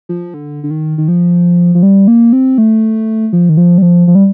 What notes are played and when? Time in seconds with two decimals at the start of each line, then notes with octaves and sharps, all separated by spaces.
0.09 F3
0.34 D3
0.64 D3
0.71 D#3
0.98 D#3
1.08 F3
1.75 F3
1.83 G3
2.08 A#3
2.33 C4
2.58 A3
3.33 F3
3.49 D#3
3.57 F3
3.78 G3
3.82 F3
4.08 F3
4.15 G3